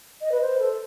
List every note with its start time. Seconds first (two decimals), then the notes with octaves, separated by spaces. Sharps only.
0.22 D#5
0.32 B4
0.42 C5
0.60 A4